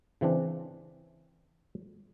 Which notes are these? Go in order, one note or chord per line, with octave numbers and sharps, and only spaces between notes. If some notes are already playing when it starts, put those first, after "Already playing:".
C#3 E3 C4 D4